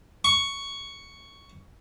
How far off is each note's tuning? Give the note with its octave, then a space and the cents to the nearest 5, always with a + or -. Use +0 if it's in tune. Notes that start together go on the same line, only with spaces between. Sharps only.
C#6 +5